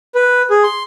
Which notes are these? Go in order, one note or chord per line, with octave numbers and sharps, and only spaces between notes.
B4
G#4
C6